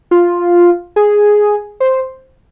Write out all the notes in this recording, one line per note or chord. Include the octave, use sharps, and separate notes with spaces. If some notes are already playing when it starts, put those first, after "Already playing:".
F4
G#4
C5